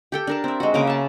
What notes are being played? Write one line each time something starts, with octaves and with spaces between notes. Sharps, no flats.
G4 A4 G5
D4 A#4 A5
C4 E5
G#3 F#4
C#3 A#3 A#4 D6
E5 A5